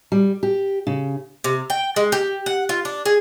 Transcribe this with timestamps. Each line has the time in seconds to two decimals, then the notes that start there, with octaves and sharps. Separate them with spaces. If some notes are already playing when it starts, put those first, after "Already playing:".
0.12 G3
0.43 G4
0.87 C#3
1.44 C3
1.70 G5
1.96 G#3
2.12 G4
2.46 F#5
2.69 F4
2.85 D4
3.06 G#4